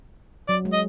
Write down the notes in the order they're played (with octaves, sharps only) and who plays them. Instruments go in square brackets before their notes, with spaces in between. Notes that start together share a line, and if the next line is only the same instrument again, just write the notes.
[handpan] F#3 [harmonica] D5
[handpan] G#3
[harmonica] D#5